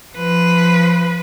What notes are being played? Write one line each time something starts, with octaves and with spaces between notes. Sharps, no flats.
F3 B4